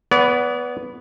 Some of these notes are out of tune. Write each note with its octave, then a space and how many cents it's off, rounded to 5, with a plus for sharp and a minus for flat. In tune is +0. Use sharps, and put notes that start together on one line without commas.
B3 +0 D5 -40